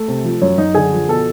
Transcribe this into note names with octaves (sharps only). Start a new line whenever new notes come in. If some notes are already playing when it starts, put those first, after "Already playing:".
Already playing: A3 A4
C3
F3
F#2 C#4 C#5
F#2 D#4 D#5
D3 G#4 G#5
F3
B2 A4 A5